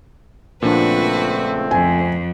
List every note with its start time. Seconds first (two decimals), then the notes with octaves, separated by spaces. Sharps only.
0.62 C#2 A#2 F3 A3 C4 D4 F#4 B4
1.71 F2 G#5